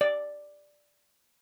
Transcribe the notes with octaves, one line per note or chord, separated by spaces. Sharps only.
D5